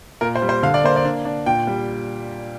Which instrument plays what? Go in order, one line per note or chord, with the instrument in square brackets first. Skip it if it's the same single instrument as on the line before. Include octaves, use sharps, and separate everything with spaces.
[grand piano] A#2 A#4
C5
G3
C5
D3 F5
D5
A#3 C5
D5
D4
D4
A#2 G5
G3